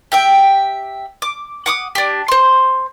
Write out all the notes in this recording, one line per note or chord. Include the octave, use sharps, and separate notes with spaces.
G4 E5 G5
D6
F#5 D6 D#6
D4 G4
C5 C6